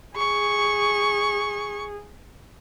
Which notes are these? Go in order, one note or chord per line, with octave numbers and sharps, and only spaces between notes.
G#4 C#6